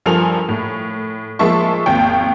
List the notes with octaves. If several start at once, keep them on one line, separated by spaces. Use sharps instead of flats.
G2 F3 A4 A#4 G#5 F7
A2
F3 G#3 A#3 E5 A5 C#6
G#1 D#2 G5